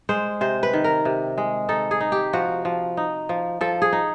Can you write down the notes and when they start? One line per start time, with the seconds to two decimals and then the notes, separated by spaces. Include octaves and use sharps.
0.09 G#3 C5
0.41 C3 C5
0.63 B4
0.74 D#3
0.84 A#4
1.05 C3
1.38 G#3
1.69 D#4 A4
1.91 G#4
2.00 D#4
2.12 G4
2.33 F3 F#4
2.65 F3
2.97 D#4
3.29 F3
3.61 F3 A4
3.82 G#4
3.93 D#4